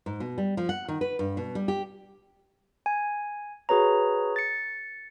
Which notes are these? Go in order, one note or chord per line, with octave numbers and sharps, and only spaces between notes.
G#2
B2
G3
F3
F#5
D#3
B4
G2
B2
G3
G4
G#5
F#4 G#4 B4 C#5 A#5
A6 C#7